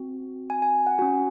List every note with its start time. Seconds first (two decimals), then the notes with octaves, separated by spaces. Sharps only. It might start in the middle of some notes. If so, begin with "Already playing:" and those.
Already playing: C4 F#4
0.50 G#5
0.62 G#5
0.87 F#5
0.98 C#4 F#4 G#5